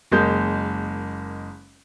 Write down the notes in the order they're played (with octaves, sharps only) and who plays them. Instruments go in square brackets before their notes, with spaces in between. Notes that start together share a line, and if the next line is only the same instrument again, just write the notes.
[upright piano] F#1 G#3 A#3 G6